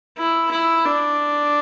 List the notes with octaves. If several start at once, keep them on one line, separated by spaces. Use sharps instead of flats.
E4
E4
D4